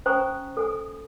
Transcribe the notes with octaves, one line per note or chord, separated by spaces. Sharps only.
C#4 C5 G#5 A#5 C#6 D#6
A4 G#5 D#6